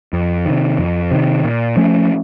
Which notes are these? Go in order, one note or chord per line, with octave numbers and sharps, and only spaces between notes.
F2
C3 D#3
F2
C3 D#3
A#2
F3 A3 C#4